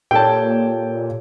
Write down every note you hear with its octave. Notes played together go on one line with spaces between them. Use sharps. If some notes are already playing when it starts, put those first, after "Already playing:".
A#2 G4 A4 C#5 G5 A5